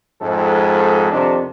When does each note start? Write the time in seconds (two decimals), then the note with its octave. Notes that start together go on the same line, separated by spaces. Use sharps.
0.21 F2 G#2 G#3 A4
1.12 F2 C3 D#3 D4